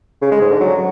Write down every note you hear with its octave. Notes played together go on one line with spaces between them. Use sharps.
C#3
G#3
G#2
D3
F#3